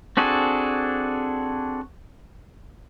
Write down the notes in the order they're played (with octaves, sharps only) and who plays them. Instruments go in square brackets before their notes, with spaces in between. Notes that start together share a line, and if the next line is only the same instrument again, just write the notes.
[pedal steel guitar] C4 D4 F#4 G#4 A4